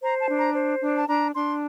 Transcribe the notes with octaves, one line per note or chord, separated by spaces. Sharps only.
C5 A#5
A5
D4
A#5
C5
D4
A5
D4 A#5
D4 C6